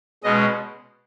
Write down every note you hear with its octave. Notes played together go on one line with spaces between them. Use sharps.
B2 G#3 C#4 D#5